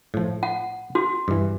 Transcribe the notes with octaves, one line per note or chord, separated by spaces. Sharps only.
A2 F3
F#5
F#4
G2 E3